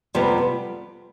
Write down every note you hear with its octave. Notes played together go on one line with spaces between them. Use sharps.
F2 C3 G3 B3